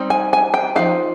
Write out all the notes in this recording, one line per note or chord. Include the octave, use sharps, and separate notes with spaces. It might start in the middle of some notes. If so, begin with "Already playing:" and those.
Already playing: G3 C4 D#4
G#5
G#5
G5
F3 C4 D#4 F5